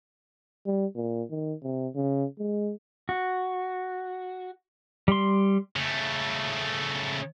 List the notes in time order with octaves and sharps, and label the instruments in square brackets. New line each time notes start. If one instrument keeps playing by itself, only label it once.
[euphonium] G3
A#2
D#3
C3
C#3
G#3
[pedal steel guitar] F#4
G3 C6
[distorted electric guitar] C#3 A3